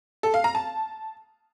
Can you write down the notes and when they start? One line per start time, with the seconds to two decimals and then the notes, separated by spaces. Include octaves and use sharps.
0.23 A4
0.34 F5
0.44 A#5
0.55 A5